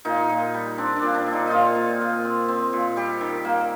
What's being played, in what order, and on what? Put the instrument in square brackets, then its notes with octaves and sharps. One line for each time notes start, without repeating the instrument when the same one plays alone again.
[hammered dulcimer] A#2 D#4
A#2
G3
C4 D4
D4
A#2
D4
A#2
D#4
A#2 D#4 F4
A#2
A#2
C4
C4
A#2
G3 G4
D#3
A#3